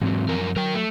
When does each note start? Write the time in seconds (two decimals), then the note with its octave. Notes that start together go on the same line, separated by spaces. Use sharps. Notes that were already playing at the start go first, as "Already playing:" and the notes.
0.02 G#2 E3 F#3 C4
0.28 F#2 F3 A#4
0.56 F#3 A#4 G5
0.74 A3